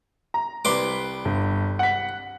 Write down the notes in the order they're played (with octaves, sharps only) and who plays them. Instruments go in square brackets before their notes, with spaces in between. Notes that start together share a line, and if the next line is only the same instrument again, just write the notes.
[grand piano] A#5
[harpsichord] C2 C6 D6 [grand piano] B4
[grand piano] G1
F#5 B6